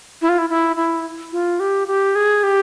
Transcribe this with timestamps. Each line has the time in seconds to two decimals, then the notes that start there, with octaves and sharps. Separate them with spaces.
0.22 E4
0.29 F4
0.38 E4
0.50 E4
0.76 E4
1.32 F4
1.60 G4
1.88 G4
2.15 G#4
2.43 G4